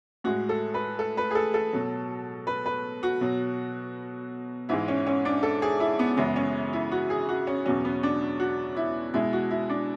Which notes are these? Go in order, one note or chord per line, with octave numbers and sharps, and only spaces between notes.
A2 G#3 F#4
A4
B4
A4
B4
G#4
A4
A4
B2 F#3
B4
B4
F#4
B2 F#3
G#2 E3 G#3 E4
C#4
C#4
D4
A4
G#4
E4
B3
F#2 C#3 E3 G#3 B3
C#4
E4
F#4
G#4
F#4
C#4
E2 B2 F#3 C#4
B3
D4
F#4
E4
B2 G#3 E4
F#4
E4
D4